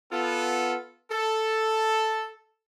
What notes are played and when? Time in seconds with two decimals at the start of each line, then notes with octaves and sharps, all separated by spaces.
0.12 B3 F4 A4
1.11 A4